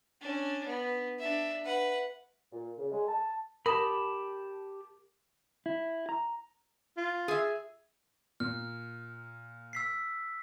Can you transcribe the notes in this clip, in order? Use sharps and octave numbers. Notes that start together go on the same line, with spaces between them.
C#4 D4
B3
D4 E5
B4 F#5
A#2
C#3
G#3
A5
G4 A#4 A5 B5 D#6
E4
A#5
F4
G#4 E5
A#2 F6
E6 B6 C7